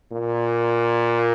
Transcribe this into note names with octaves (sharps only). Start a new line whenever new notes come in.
A#2